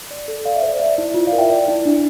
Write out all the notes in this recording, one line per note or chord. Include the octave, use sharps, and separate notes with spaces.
D5
A4
A4 D5 F5
E5
C5
D5
D5 E5
E4
F4
D5 F5
A#4
E5 G5
D5
E4
D4